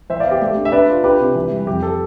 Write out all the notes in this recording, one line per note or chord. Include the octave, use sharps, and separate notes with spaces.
E3 C5 E5
D5 F5
B3
G4
A3 G4
D4
E5
D4 B4 D5
F4
D4 G4 B4
C3
E3
G3
F2 G4
A4